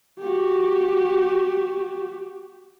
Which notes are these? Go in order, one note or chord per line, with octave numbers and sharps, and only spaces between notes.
F#4 G4